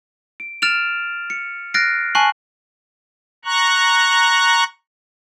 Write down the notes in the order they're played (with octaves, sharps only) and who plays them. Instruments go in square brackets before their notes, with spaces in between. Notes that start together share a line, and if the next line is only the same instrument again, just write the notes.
[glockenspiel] D7
F6 A6 D7 E7 F7
C#7
F6 F#6 A6 A#6 C7 D7
G#5 A5 C#6 F#6 C7 F#7
[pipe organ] A#5 C#6 F#6